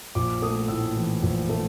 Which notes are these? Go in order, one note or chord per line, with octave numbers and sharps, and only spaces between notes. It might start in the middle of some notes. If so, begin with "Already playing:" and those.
A#1 D6
A3 D#6
A2 E6
E3
A#1
A3